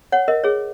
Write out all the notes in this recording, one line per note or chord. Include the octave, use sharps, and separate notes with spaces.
C#5 F#5
A#4 D#5
G#4 C#5